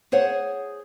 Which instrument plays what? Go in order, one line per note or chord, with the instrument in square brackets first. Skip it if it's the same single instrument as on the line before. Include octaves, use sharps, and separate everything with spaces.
[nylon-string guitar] G#4 C5 C#5 F#5